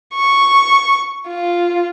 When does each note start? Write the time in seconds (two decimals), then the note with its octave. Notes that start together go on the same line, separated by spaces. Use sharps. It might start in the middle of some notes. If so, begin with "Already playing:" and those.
0.14 C#6
1.29 F4